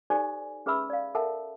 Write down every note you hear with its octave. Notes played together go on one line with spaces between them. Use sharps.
D#4 G4 A4 C5 D5 G#5
C#4 G#4 B4 E5 B5 E6
D5 F5
A4 A#4 E5 F#5 A5